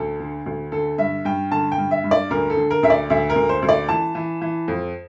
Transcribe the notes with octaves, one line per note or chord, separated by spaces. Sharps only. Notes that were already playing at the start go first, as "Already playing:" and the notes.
Already playing: D2 A4
D3
D2
D3 A4
G2 E5
G2 G5
D3 A5
G5
G2
E5
G2
D5
D2 A#4
A4
D3
A#4
D2 E5
D5
D2 E5
A#4
D2
C5
D2
D5
E3 A5
E3
E3
F2